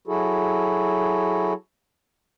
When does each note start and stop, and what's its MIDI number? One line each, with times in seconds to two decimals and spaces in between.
0.07 1.53 54
0.07 1.53 64
0.07 1.53 66
0.07 1.53 68
0.07 1.53 69